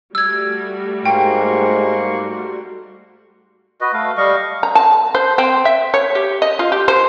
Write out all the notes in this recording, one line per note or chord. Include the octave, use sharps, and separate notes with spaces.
G3 A3 F#4 E6 G#6
G#2 A#3 G5 C6 C#6
F#4 B4 D#5
A3 F5
G3 D#5 F5 C#6
A#5
A5
C5
C4
E5
C#5
G4
D#5
F4
G4
C5